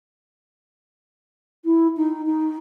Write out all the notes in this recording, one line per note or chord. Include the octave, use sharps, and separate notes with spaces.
E4
D#4
D#4